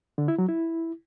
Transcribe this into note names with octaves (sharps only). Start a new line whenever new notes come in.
D3
E4
F#3
E4